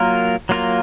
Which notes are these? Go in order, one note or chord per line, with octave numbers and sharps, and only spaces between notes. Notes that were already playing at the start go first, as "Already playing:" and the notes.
Already playing: F#3 A#3 F4 A#4
F#3 A#3 F4 A#4